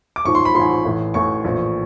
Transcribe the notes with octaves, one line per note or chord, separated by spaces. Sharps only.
D6
A1 G#2 F3 C#6
C6
B5
A1 G#2 F3 C6
A1 A2 E3
A1 A2 E3 C#6
A#1 A2 E3